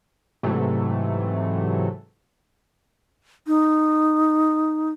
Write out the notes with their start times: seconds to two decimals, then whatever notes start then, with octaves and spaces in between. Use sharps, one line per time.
0.43 G#2 C3 E3 F#3 A3
3.47 D#4